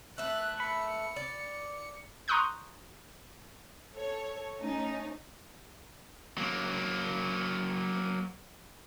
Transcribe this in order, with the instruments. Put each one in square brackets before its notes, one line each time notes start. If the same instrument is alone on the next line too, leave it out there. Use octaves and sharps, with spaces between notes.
[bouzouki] A3 B4 [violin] F#6
[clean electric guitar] B5 [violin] C#7
[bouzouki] D5
[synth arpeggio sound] A#5 C6 C#6 D#6 F#6 G6
[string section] A4 C#5
A3 C#4 D#4
[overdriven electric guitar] F#3 A#3